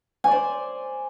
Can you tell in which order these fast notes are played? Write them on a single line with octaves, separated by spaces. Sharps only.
G#5 D5 C5